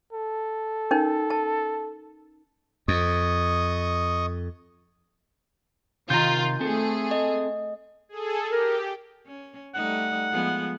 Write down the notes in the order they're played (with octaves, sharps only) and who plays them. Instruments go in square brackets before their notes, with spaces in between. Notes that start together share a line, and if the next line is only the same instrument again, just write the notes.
[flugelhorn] A4
[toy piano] C#4 D#4 A#4
A5
[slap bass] F2 [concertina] D#5 C#6 D#6
[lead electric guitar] C3 A#5 [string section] D#3 F4 [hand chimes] G6
[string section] A3 G#4 [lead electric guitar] C4 A4
[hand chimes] D#5
[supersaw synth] G#4 A4
[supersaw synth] G4 [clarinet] A#4
[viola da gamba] C#4
[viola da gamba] G3 A3 D#4 [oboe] F#5
[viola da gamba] F3 G#3 B3